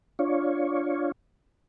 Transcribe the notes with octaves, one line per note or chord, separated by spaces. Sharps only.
D4 F4 C#5